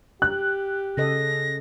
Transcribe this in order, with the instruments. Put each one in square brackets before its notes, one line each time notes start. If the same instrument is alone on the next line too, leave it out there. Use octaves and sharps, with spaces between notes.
[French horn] G4 [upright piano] F#6
[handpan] C#3 A4 D#5 [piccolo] A#6